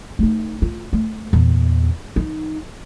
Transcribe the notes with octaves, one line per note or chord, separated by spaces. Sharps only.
A3 D#4
F4
A3
E2 A#2
F3 D#4